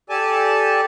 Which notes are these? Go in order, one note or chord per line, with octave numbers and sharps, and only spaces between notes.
G4 A4 D5 G#5 A5